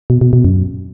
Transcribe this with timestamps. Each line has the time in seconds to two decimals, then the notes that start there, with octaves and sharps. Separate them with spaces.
0.10 B2
0.21 B2
0.33 B2
0.45 F#2